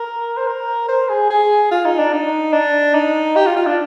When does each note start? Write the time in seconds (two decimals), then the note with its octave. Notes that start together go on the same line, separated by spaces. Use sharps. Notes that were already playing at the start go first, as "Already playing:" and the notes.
Already playing: A#4
0.37 C5
0.47 A#4
0.89 C5
1.09 G#4
1.30 G#4
1.71 F4
1.85 D#4
1.99 D4
2.13 D#4
2.53 D4
2.95 D#4
3.36 G4
3.46 F4
3.56 F4
3.67 D4